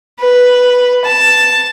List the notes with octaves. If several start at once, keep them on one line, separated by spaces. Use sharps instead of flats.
B4
A5